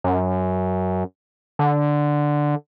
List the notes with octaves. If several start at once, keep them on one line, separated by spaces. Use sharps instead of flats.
F#2
D3